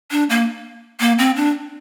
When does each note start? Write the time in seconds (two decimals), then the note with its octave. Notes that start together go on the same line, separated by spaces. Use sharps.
0.11 D4
0.30 A#3
1.00 A#3
1.18 C4
1.36 D4